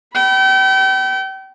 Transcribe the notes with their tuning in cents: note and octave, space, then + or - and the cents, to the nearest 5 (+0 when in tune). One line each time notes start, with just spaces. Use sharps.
G5 -35 B5 +0